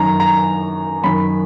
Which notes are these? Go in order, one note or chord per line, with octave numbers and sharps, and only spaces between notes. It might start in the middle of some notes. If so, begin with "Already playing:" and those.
Already playing: F#2 D#3 A#5
A#5
F#2 D#3 B5